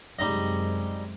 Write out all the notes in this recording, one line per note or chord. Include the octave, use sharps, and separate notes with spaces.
F#2 C3 G3 G#3 D#4 D#5